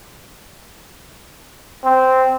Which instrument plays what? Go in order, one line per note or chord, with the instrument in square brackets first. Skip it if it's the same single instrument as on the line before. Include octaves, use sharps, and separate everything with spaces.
[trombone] C4